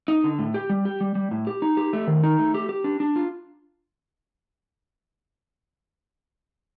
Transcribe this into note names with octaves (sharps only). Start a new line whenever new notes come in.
D#4
D3
A2
G4
G3
G4
G3
G3
A2
G4
D#4
G4
A3
D#3
D#4
A3
G4
G4
D4
D4
F4